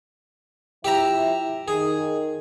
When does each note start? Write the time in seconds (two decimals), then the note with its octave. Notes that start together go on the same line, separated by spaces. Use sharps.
0.84 F3 E4 G4 E5 A#5
1.68 D#3 G#4